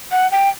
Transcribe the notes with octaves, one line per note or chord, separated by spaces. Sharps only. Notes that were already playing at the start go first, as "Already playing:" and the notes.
F#5
G5